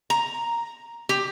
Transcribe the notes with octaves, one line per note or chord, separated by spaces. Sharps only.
A#5
G4